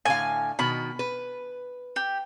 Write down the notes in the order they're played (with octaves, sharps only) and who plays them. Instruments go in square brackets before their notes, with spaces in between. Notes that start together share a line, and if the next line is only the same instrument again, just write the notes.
[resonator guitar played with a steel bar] A2 D3 F5 [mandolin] G#5
[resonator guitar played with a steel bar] B2 D#3 [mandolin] B5
[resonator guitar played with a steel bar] B4
[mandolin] G4